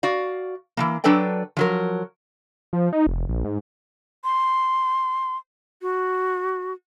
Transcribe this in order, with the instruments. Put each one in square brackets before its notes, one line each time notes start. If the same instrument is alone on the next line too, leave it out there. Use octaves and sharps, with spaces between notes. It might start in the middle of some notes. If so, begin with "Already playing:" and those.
[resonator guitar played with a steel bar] F#4 D5 F5
E3 F3 A#3
F#3 D4 A4 B4 D5 G5
F3 F#3 A#4
[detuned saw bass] F3
D#4
F1
A#1
G#2
[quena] C6
F#4